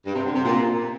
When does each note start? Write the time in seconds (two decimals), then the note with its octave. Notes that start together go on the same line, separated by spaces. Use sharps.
0.05 G2
0.15 C3
0.25 D3
0.35 C3
0.45 A#2